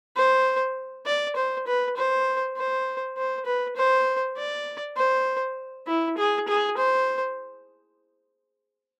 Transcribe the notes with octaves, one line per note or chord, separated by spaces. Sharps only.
C5
D5
C5
B4
C5
C5
C5
B4
C5
D5
C5
E4
G#4
G#4
C5